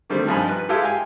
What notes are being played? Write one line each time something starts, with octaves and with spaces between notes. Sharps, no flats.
D3 D#3 G3 A3 C4
G2 F3 D4 D#4 G#5 B5
B4
G#3 E4 F4 G4 A4
F5 G5 G#5